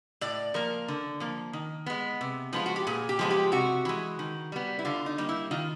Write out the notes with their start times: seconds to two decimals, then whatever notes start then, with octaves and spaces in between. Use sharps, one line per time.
0.21 A2 D5
0.54 F3 A#3 A#4
0.88 D3
1.20 F3 A#3
1.53 D#3
1.86 G#3 B3
2.21 C3
2.53 F3 G#3 B3 F4
2.66 F#4
2.76 G4
2.87 A#2 G#4
3.09 G4
3.19 F3 G#3 B3
3.30 G4
3.52 C3 F#4
3.85 E3 G#3
4.19 D#3
4.52 G3 B3
4.79 E4
4.85 D3 F4
5.06 D#4
5.18 G3 A#3
5.29 E4
5.51 D#3 F4